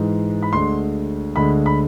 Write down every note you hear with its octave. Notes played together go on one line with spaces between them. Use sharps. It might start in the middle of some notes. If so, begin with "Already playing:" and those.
Already playing: G#2 E3 G#3
B5
D2 D3 G#3 C6
D2 D3 G#3 B5
B5